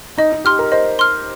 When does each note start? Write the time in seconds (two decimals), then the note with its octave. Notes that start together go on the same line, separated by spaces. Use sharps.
0.18 D#4 D#5
0.32 D#4
0.45 G4 C6 F6
0.59 A#4
0.72 C5 D#5
0.99 C6 F6